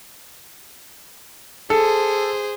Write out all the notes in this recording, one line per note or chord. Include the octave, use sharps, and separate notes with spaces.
G#4 A4 C5